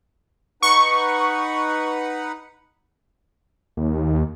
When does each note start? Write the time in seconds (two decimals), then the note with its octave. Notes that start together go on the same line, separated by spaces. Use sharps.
0.62 D#4 B4 F#5 C#6
3.77 D#2